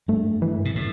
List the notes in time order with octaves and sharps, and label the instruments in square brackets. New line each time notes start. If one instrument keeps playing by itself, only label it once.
[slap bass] G2 [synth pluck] A3
[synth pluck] E3
[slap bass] B2
A2